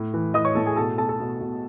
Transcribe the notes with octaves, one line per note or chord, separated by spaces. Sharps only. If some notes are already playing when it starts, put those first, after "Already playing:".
Already playing: A2
E3
E3 D#5 D#6
C#5 C#6
A2 A4 A5
G#4 G#5
B2 A4 A5
B2 A4 A5
A4 A5
B2
B2